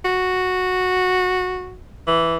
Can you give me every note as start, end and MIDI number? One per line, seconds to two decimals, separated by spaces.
0.05 1.78 66
2.07 2.37 52